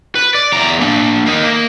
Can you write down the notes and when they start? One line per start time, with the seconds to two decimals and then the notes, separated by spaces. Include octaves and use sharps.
0.15 B4
0.35 D5
0.52 E2 A#5
0.80 A#3 D4
1.26 A#3 D#4
1.44 A#3